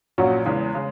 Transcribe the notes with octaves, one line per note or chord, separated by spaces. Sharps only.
A#1 A#2 F#3 C#4 F#4
E2 C#3 G#3
C#3 G#3